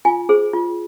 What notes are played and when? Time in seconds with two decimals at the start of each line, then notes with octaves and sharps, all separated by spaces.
0.05 F4 G#5
0.29 G#4 C5
0.53 F4